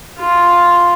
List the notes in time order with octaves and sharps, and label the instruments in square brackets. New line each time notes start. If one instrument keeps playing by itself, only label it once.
[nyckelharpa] F4